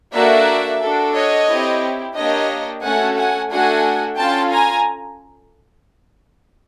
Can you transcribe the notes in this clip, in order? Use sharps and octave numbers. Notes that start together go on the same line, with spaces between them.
A#3 D4 F#4 A4 D5 E5
D4 F#4 A4
C#5 D#5
C4 E4 G4
A#3 D4 G4 C#5 D#5
A3 C#4 F#4 A4 F#5 G#5
F#5 G#5
A3 D4 F#4 A4 F#5 G#5
C#4 F4 A4 G5 A5
G#5 A#5